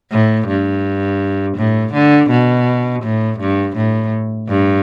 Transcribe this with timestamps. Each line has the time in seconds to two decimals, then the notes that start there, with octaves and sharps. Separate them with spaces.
0.11 A2
0.47 G2
1.57 A2
1.93 D3
2.30 B2
3.03 A2
3.39 G2
3.76 A2
4.49 G2